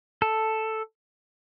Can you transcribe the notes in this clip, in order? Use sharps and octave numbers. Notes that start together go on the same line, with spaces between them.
A4